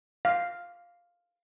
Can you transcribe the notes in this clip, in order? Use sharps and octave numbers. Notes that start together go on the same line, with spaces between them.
F5